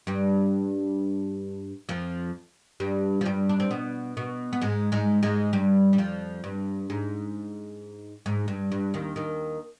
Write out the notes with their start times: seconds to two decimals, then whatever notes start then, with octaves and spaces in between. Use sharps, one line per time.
0.07 G2 G3
1.89 F2 F3
2.80 G2 G3
3.21 F3
3.26 G2 G3
3.49 D4
3.60 C4
3.71 B2 B3
4.17 B2 B3
4.53 B3
4.61 G#2 G#3
4.92 G#2 G#3
5.23 G#2 G#3
5.53 G2 G3
5.93 G3
5.98 F2 F3
6.44 G2
6.90 G#2
8.26 G#2
8.48 G2
8.72 G2
8.94 D#2 D#3
9.16 D#2 D#3